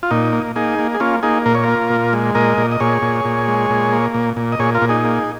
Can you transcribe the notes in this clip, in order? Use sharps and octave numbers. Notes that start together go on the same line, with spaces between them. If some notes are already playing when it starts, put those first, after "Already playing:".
F4
A#2 D#4
A#3
A#3 D#4 G#4
A#3
G#4
A#3 C#4 F4
A#3 D#4 G#4
A#2 A#4
C#5
A#3 F4 A#4
A#2
G#3
A#2 A#4 D#5
A#2
D#5
A#2 G#4 C#5
A#2
A#2
G#3
A#2
A#3
A#2
A#2
D#5
A#2 G#4 C#5
F4 A#4
A#2
D#4 G#4
A#3